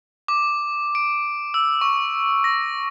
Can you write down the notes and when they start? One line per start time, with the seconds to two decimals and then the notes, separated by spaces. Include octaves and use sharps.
0.28 D6
0.95 D7
1.54 E6
1.81 C#6
2.44 A#6